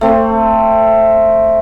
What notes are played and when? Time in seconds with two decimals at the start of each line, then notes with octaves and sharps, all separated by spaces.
0.01 A3 C4